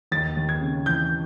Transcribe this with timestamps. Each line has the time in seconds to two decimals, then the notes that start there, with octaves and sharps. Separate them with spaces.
0.12 D#2 A6
0.37 D#2
0.49 G#6
0.61 C#3
0.86 E3 G6